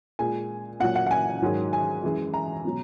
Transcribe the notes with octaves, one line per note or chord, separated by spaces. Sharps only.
A#2 G#3 G#5
A#2 F#3 F#5
F#5
F#5
G#5
G#2 D#3 F#3
G#5
F#2 E3 G#3
A#5
B2 F#3